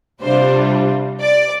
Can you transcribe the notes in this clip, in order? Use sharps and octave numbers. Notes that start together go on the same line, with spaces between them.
C3 G3 D4 F4 C5
D5